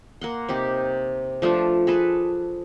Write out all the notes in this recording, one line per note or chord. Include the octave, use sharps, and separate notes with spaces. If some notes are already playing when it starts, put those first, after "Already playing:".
A#3 F#5 C6
C3 D#4 G4
F3 A3 D4 F4
G#4 A4 B4